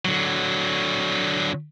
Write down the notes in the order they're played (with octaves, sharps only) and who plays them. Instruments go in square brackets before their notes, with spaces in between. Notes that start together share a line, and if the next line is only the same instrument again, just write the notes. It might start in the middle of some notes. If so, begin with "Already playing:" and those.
[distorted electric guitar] D3 F#3